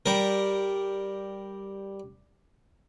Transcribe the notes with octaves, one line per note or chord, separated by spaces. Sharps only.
G3 A#4